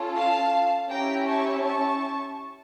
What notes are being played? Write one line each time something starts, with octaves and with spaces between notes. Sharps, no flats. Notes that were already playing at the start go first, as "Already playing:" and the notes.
Already playing: C#4 F4 A4
F5 A5
C#4 E4 G4 G5 A#5
A5 C#6
A5 C#6